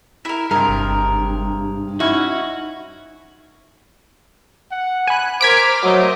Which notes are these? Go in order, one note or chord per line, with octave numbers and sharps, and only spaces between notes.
E4 A#4
G2 C3 G#3 A#4
G1
C#4 D#4 E4 F#4 C#6
F#5
G#5 B5 F#6
A#4 C5 D6 F6 G#6 B6 D7
F#3 A3 A#4 C5 D#5